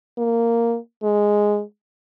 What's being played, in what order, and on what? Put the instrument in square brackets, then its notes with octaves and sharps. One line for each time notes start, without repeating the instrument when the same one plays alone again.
[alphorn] A#3
G#3